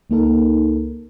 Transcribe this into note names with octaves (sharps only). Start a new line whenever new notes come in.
C#2 A#3 D#4 A4 A#4